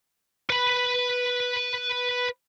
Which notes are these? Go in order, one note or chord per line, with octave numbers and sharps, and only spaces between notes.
B4 B5